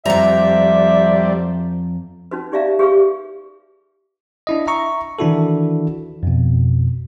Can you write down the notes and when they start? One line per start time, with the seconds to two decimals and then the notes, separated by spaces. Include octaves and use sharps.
0.05 F2 G3 C5 D5 E5 A#5
2.31 C#4 D#4 F#4 B4
2.52 D#4 G4 D5 E5 F5 A#5
2.79 G4 G#4 B4 F5 C#6
4.47 D4 E4 D#5
4.67 E5 A#5 C#6
5.19 D#3 E3 D4 E4 F#4 A4
6.23 F2 B2